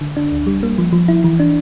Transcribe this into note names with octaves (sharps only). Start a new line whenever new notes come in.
D3
D4
D2
G3
A#3
F3
F3
E4
E3
D4